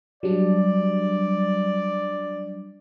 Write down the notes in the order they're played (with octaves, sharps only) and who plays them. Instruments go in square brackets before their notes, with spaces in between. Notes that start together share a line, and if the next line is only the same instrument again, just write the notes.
[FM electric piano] F#3 G3 D4 [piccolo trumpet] D5